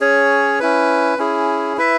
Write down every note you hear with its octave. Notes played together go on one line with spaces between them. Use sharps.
C#4 G#4 C#5
C#4 E4 B4
C#4 E4 G#4
E4 B4 E5